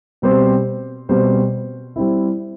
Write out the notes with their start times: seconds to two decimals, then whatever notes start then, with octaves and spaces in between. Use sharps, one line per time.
0.22 B2 G3 C4 G4 C5
1.09 B2 G3 C4 G4 C5
1.96 G3 C4 E4